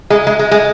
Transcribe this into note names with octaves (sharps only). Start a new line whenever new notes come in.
G#3
G#3
G#3
G#3